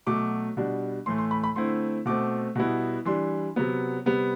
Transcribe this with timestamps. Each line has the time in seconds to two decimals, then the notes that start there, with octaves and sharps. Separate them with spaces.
0.06 B2 F#3 A3 D6
0.57 B2 G3 D4
1.06 A2 E3 A3 C6
1.18 C6
1.31 B5
1.44 B5
1.56 D3 A3 C4 E4 C6
2.06 B2 A3 C4 D6
2.56 B2 G3 B3 E4
3.05 E3 G3 D4 C6
3.56 C3 F#3 B3
4.06 C3 G3 B3